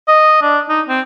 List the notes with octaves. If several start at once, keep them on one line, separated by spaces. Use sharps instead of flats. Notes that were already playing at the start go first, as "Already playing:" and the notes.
D#5
D4
D#4
C4